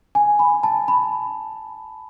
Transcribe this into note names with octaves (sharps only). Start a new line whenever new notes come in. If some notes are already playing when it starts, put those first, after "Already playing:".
G#5
B5
A5
B5